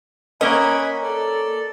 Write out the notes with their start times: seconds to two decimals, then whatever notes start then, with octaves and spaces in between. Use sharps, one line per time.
0.41 A#3 C#4 A#4 D#5 F#5 G#5 B5
1.03 A4 D5